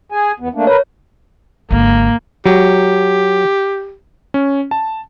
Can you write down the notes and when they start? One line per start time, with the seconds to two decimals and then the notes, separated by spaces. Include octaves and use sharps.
0.12 G#4 G#5
0.40 E2 B3
0.54 A3 A#3 D4
0.67 A#4 B4 C#5
1.71 G#1 D3 A#3
2.46 F#3 G4
4.34 C#4
4.71 A5